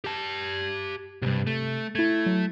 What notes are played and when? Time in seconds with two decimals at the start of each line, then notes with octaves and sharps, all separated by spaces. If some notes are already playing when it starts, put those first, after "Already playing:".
0.04 G4 A5
1.22 C2 G2 C3
1.47 A3
1.95 A3 E4 G#6
2.26 F#3